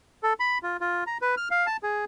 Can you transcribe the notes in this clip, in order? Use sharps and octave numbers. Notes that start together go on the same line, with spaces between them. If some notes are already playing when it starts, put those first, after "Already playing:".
A4
B5
F4
F4
A#5
B4
F6
F5
A5
G#4